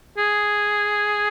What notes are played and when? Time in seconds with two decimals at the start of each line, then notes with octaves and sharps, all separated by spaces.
0.17 G#4